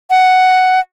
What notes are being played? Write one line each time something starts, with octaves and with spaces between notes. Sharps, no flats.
F#5